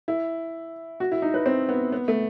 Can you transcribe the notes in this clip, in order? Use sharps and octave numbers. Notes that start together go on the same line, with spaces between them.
E4
F#4
E4
D#4
B4
C4
B3
B3
A3